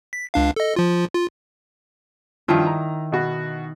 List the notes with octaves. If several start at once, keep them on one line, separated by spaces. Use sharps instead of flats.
B6
C#2 D4 F5
A4 D#5
F3 F4
F4
G2 D#3 F3 E4 F4
A#5
B2 F#4